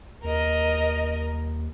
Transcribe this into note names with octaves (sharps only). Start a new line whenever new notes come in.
D#2 A#4 D#5